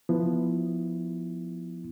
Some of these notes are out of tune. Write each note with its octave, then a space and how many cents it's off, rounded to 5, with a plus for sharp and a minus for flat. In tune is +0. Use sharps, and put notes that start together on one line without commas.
F3 +0 B3 +0 E4 +0